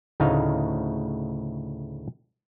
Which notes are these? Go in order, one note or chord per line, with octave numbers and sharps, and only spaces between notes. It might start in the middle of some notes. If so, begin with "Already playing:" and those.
D2 A2 C#3 D#4 F5